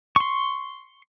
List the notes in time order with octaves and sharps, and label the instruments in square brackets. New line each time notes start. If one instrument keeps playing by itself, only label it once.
[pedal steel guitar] C6 C#6